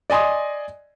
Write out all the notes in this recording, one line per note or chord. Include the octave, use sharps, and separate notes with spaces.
D5 D#5 G#5 C6 D#6